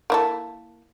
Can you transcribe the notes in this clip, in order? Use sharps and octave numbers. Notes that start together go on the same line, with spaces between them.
A#3 E4 A4